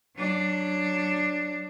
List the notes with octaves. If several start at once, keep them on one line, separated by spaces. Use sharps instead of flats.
F#3 D4